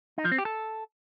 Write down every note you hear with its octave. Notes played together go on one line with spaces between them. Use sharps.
D#4
F3
C4
G4
A4